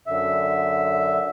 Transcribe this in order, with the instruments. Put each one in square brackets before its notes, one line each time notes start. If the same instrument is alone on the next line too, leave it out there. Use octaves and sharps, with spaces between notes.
[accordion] F#2 D3 E5